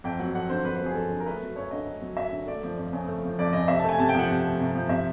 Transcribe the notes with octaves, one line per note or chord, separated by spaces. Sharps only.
F2 G5
F#3 F#5
F2 F#5
D3 C5
F2 B4
C5
F#3
G#4
F2 A4
D3
A#4
A3 B4
F#3
F#2 C#5
D3 D#5
A3
F#3
F#2 E5
D3
A3 D5
F3
F2
C#3
A3
F3
F2 D5
C#3 D#5
C3 E5
A5
A3 G#5
C3 A5
G5
F3 F#5
C3
A3
C3
F3
C3 E5